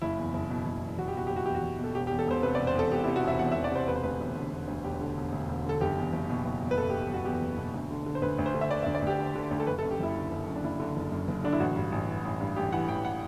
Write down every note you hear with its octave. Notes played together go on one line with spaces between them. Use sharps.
F#1 E4
E2
F#1
B2
F#1
E2
F#1 F#4
G4
B2 F#4
F#1 G4
F#4
E2 G4
F#4
F#1
B2
A4
E1 G4
G4
E2
A4
E1 C5
C3 B4
D5
E1
C5
E2 A4
E1 G4
E4
C3
F#4
E1 E5
E2 F#5
E5
E1
D5
C3 C5
E1 B4
C5
D2 B4
E1
D3
E1
D2
E1 G4
D3
E1
D2
E1
D3 A4
F#1 G4
E2
F#1
B2
F#1
E2
B4
F#1 A4
G4
B2
G4
F#1 F#4
E2 G4
F#1
B2
D2
D3
D3
C5
D2 B4
D2
C5
D3
E5
D3 D5
E5
D2
D5
D2 G4
D3
D3
D2
A4
F#1 B4
A4
F#2
G4
F#1 E4
D3
F#1
F#2
D4
F#1 E4
D3
F#1
F#2
F#1
D3 D4
E4
A1 F#4
G2
A1
E3
A1
G2
A1 G4
E3 F#5
A1 G5
F#5